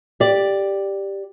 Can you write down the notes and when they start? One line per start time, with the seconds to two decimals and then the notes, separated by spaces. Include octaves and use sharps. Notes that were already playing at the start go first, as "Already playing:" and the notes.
0.20 G4 D5